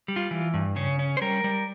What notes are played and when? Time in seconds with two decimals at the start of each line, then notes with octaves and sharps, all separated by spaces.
0.08 G3
0.16 F4
0.31 E3
0.54 G2
0.76 C#3 C#4
0.99 C#4
1.17 C5
1.21 G3 A#4
1.44 G3